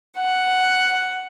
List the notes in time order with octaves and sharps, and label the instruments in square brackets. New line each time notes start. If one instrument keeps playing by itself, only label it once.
[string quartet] F#5